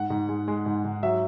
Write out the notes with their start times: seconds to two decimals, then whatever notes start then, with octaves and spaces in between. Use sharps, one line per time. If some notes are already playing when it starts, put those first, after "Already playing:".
Already playing: G#2 F#5
0.10 G#2
0.29 G#3
0.48 G#3
0.66 G#2
0.84 G#2
1.03 F#3 E5